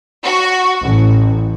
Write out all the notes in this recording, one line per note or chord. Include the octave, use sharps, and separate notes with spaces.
F#4
A1